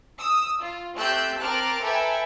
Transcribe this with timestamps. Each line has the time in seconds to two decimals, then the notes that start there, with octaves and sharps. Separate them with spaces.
0.18 D#6 E6
0.60 F4
0.96 A3 C4 G4 E6 F#6 G6
1.40 C4 A#4 A5 D6 F6 F#6
1.82 A4 B4 E5 G5 G#5 A#5